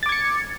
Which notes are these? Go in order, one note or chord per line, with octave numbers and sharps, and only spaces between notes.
D6 G#6 A6 C#7